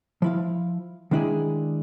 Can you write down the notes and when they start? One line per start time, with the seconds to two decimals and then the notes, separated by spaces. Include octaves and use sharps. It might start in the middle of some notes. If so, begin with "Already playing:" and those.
0.22 F3 E4 F5
1.11 D#3 G#3 D4 E4 G#4